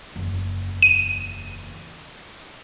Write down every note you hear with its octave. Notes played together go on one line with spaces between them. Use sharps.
F#1 E2
D#7